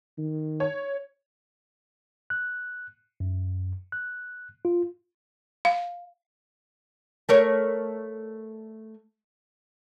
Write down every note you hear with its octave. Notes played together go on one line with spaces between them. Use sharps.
D#3
C#5
F#6
F#2
F#6
F4
F5
A3 A#4 C#5